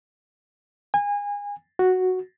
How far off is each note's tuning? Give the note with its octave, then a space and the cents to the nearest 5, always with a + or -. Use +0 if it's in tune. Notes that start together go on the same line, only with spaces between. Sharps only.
G#5 -30
F#4 +0